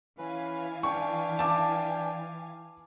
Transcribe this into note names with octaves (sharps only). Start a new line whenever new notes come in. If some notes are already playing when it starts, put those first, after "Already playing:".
E3 C#4 B4 F5 G#5
D4 G5 C#6
A5 D6